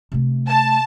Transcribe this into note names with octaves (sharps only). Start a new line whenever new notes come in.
C3 A3
A5